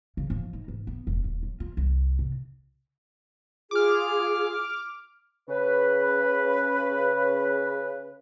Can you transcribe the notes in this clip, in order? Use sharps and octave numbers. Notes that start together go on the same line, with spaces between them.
C#3
F3
D#4
G#2
B3
E1
D#1
F#3
F4
C2
C3
F4 G#4 D6 F6
C#3 B4